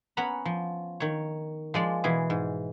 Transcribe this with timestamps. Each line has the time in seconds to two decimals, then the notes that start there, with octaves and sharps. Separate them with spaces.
0.17 B3 C#4 F#5 A#5 B5
0.45 F3
1.00 D#3 C#5
1.74 F3 G#3 D5
2.04 B2 E3 G#4
2.30 G#2